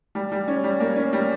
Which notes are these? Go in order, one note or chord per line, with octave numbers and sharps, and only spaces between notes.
G3
G3
C#4
G3
A#3
C#4
G3